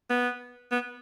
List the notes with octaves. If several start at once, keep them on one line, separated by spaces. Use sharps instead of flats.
B3
B3